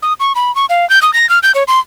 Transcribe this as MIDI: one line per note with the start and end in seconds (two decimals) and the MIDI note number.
0.02 0.13 87
0.20 0.33 85
0.35 0.54 83
0.56 0.66 85
0.69 0.88 77
0.90 0.99 91
1.02 1.13 87
1.14 1.29 94
1.29 1.39 89
1.43 1.52 91
1.55 1.63 73
1.68 1.79 84